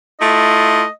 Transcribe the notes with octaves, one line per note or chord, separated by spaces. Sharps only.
A3 E4 F4 D#5